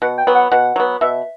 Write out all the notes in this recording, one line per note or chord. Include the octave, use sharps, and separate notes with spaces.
B2 F#5
G5
F#3 B3
F#5
B2 F#5
F#3 B3
B2 E5